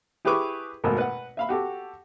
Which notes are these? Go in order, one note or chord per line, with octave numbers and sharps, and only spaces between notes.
E4 G4 G#4 B4 C#6 D6
G#1 B2 A3 A#3
B4 F#5
E5 F5 B5
F#4 G4 A4